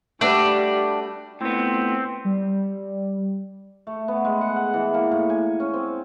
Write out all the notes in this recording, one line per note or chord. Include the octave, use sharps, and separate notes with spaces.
G3 A3 D4 F#4 B4
A2 B3 C4
G3
A3
B3
G#3
F#5
F#5
E3
A#3
A2
G#5
C#4
C4